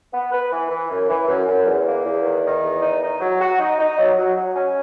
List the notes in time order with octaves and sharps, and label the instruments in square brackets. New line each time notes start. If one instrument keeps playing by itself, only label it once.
[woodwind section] B3
B4
E3
E3
F#2
E3
F#2
F#2
E2
A#3
E2
D#3
D#3
E2
D#4
D#4
F#3
F#4
D#4
D#4
F#3
F#3
F#3
C#4